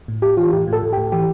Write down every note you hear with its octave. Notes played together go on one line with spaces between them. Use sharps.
A2
A2 G4
E3 F4
A2 G4
A2
A4
A2
G4
A2
E3 G4